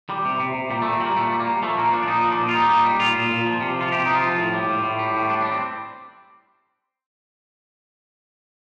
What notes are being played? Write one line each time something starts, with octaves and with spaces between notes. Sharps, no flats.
G3
C3
C3
C3
A#2 G3
A#2 A3
C4
G3 A3 A#3
A#2 A3
G3
A#3
G3
F3 A3
A#2 A#3
F3 D4
D4
A#2 D#4
F3
D4
A#2
F4
G3 D#4
A#2
G3
A#2 F4
A#2
A#2
F3
C3
F3
F4
C3 G4
F3 D#4
F4
F3
A2
G3
A2
A2
G3
A2
G3 D4
G3 D4
C4